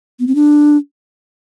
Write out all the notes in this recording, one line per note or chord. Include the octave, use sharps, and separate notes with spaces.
B3
C4
D4